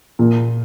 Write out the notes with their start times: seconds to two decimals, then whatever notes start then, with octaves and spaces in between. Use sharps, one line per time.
0.19 A#2